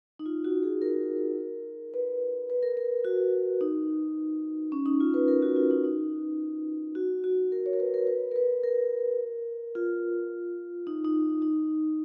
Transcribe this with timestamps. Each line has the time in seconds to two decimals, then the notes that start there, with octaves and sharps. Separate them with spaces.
0.19 D#4
0.26 F4
0.44 F#4
0.63 G#4
0.82 A#4
1.94 B4
2.50 B4
2.63 A#4
2.77 A#4
3.05 F#4
3.61 D#4
4.72 C#4
4.86 D#4
5.00 F4
5.14 B4
5.28 A#4
5.42 F#4
5.56 F4
5.71 D#4
5.84 D#4
6.95 F#4
7.24 F#4
7.52 A#4
7.66 C#5
7.73 A#4
7.80 B4
7.94 A#4
8.07 B4
8.32 A#4
8.36 B4
8.63 A#4
9.75 F4
10.87 D#4
11.05 D#4
11.42 D#4